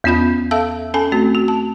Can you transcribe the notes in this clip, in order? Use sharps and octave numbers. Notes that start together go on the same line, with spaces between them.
E2 B3 C#4 F4 B5 G6
A4 E5 F5 A5 E6
C#4 A4 G#5 A5
A3 C4 F#4
F#4
A5